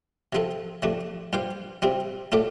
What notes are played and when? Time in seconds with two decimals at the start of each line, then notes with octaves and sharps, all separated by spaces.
0.33 C3 F3 C4 A4
0.82 C3 F3 A3 D4
1.33 G2 G3 F4 C5
1.82 C3 G3 C4 F4
2.32 A2 A3 F4 A4 D5